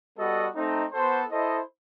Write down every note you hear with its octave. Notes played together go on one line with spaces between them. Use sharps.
G3 B3 F#4 A4 D#5
A3 C4 D#4
B3 F#4 A4 C5
E4 A4 C5 D#5